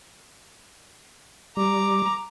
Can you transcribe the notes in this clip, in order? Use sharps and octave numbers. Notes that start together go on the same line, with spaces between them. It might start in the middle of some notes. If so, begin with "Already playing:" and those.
G3 A#5 D6